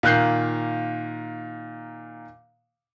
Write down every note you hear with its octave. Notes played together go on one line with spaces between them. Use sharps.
A#2 D#3 A#3 F#6 G6 C7